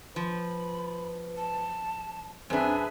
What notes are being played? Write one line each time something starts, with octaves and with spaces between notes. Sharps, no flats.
F3 B4 B5
A5
F#2 C4 D4 G#4 B4 E5 G#5